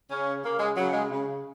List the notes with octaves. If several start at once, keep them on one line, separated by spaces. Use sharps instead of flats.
C#3 C#4
C#3 A#3
G#3
C#3 F#3
G#3
C#3